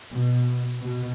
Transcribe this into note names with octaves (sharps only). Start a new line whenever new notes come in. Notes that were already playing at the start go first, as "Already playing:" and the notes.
B2
B2